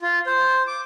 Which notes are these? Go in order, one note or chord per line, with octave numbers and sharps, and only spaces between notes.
F4
C5
D6